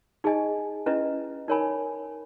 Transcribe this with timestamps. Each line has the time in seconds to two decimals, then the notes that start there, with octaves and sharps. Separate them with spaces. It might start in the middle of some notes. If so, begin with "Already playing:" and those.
0.24 D#4 G#4 D#5 G#5
0.86 C#4 E4 B4 D#5
1.48 D#4 A#4 C#5 G#5 B5